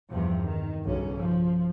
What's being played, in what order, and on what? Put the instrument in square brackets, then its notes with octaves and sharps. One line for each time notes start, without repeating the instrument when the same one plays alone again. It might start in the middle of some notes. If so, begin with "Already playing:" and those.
[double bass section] E2 G2 C3 F3
D#3
B1 G2 C#3 C#4
F3